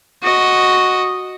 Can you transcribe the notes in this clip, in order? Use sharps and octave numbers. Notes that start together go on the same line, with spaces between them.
F#4 D#5